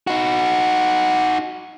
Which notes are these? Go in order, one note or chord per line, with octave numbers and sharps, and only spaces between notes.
D#4 F#4